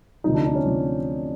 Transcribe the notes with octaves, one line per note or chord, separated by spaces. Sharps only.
D2 C3 F3 D#4
D4
D4
C#4
C3 F3